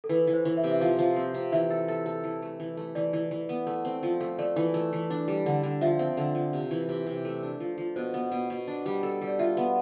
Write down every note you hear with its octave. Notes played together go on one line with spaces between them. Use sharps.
A4
E3 B4
E3
C5
E3
E5
C3
E5
F3 F5
F3
C4
C3
E3 E5
A4
A4
A4
E3
A3
E3
A3
E3 D5
E3
E3
B3
A3
C4
F3
A3
A3 D5
E3
A3
E3
D4
G3
D3
D3
F3 E5
C4
D3
F3
C3
E3
C3
C3
A3
D4
F3
F3
B2 C5
B3
B2
B2
D4
G3
A4
G3
D5
F4 E5
B3